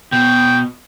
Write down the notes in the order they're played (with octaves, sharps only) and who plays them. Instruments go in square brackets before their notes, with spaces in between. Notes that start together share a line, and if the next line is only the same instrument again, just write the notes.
[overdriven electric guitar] B2 [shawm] G5